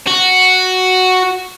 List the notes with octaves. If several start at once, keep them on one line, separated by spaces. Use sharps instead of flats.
F#4